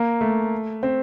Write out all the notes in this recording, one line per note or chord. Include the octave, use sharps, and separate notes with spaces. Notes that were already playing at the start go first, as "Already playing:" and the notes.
Already playing: A#3
A3
C4